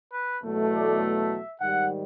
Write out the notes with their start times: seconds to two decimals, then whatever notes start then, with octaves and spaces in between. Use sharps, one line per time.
0.13 B4
0.43 E2 B2 F#3 A3
0.74 D5
1.02 E5
1.61 G#2 D#3 G3 F#5